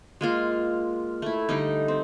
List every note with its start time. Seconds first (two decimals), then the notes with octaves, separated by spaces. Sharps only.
0.21 G#3 A#3 F4
1.22 A3 E4
1.49 D3 G3 D#4
1.88 C4